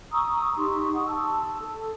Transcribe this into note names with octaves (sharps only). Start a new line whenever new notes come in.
A#5 C#6 D#6 E6
D#4 G4 C6 C#6
F#5 C#6 D#6
A5 E6
A4